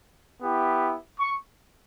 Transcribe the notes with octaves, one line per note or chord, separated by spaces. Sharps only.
B3 E4 G4
C#6